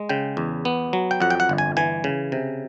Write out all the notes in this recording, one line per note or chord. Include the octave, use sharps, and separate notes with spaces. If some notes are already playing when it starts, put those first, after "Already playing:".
Already playing: G#3
C#3 G5
E2
B3
F#3
G5
F2 F#5
G5
F#5
G1
G#5
E3 G#5
C#3
C3